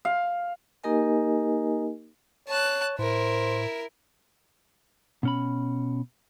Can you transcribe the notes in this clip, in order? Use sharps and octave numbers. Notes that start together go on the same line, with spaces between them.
F5
A#3 D#4 G4 A#4 D#5 G#5
C#5 A5 F#6
A2 E4 A#4 C5
B2 C#4 B5